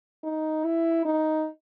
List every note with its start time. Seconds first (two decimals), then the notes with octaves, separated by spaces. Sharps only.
0.24 D#4
0.65 E4
1.05 D#4